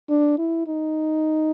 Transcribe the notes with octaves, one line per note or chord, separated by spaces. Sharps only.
D4
E4
D#4